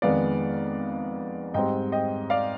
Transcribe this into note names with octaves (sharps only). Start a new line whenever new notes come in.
F2 D#3 G#3 B3 D5 F5
G#2 G3 C4 D#5 G5
D#5 G5
D5 F5